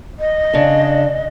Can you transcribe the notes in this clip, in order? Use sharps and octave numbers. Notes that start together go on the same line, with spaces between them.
D#5
C#3 D4